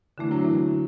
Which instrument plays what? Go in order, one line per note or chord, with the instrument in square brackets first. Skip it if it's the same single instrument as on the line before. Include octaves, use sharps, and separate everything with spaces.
[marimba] D3 A3 D4 [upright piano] E3
[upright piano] F#3
E3